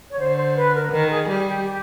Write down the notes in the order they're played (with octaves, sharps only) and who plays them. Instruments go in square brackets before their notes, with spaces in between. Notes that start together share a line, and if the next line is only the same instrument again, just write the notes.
[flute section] C#5
[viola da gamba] D3 [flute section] C5
[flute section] C5
B4
A#4
[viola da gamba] D#3 [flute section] A#4
[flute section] G#4
[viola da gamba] G3 [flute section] G4
[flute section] G4
G4